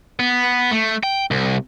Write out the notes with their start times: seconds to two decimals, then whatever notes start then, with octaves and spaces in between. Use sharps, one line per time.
0.20 B3
0.71 A3
1.03 G5
1.31 C2